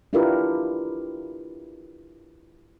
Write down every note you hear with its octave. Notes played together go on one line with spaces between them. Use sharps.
D4 E4 F4 G4 A#4 B4